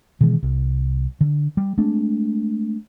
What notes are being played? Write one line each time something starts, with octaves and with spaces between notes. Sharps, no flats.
B2 D#3 E3 G#3
C2
D3
G3
G#3 A3 C4 D4